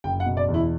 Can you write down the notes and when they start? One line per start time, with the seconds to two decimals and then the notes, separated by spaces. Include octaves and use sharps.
0.04 F#1 G5
0.20 F#5
0.26 B2
0.37 D5
0.48 E2
0.54 E4